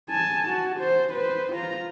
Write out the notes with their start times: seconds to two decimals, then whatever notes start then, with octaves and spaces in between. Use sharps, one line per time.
0.10 G#5 A5
0.50 F#4
0.80 C5
1.13 B4 C5
1.52 F4 A#5